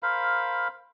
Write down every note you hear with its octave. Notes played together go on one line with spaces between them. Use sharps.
A#4 C5 F5 B5